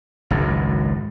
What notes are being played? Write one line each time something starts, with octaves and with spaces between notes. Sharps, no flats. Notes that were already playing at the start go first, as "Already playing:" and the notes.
G#1 C#2 F#2